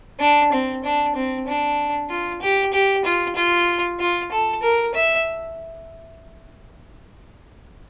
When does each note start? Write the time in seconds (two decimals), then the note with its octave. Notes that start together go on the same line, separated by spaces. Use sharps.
0.20 D4
0.52 C4
0.84 D4
1.15 C4
1.47 D4
2.09 F4
2.41 G4
2.73 G4
3.05 F4
3.36 F4
3.99 F4
4.32 A4
4.63 A#4
4.94 E5